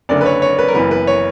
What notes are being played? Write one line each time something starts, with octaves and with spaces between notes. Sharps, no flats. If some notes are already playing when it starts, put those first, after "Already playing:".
F#1 F#2 D3 D5
B4
C#5
C#5
B4
A#4
F#1 F#2 E3 B3 B4
B4
C#5